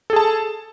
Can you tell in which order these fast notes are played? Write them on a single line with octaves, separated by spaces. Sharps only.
A4 G#4 A5